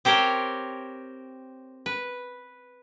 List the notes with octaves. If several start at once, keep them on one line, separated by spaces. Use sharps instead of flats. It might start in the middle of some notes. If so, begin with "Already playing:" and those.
C4 G4 A#4 C5 C#5
B4